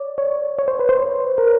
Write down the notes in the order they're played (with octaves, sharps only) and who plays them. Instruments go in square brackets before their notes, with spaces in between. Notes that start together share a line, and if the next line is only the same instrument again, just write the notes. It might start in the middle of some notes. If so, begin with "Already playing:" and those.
Already playing: [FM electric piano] C#5 D5
C#5
C#5
C5
B4
C5
A#4